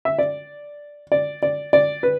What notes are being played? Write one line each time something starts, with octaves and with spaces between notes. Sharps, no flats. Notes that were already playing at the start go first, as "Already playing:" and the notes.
E5
D5
D5
D5
D5
B4